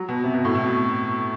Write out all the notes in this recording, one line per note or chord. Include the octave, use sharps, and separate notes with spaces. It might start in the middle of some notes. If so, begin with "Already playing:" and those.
Already playing: F#3
B2
C3
B2
A2
B2